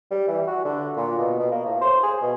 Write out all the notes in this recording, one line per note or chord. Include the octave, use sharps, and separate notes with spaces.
G3
E3
F#4
D3
A#2
B2
B2
A#3
A2
C5
G#4
B2